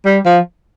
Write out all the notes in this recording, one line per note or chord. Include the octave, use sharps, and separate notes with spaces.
G3
F3